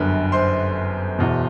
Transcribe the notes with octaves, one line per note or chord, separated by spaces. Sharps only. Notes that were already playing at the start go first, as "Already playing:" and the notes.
Already playing: G1 F#2 D3 B4
C5 C6
E1 E2 B2